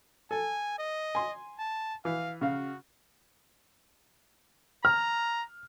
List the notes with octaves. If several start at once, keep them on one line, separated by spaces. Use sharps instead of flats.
A4 G#5
D#5
G#5 C6
A5
E3 F5
C#3 F#4 F5
A#5 F6